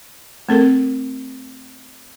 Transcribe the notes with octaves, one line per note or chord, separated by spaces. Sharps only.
A3 C4 A4 A#4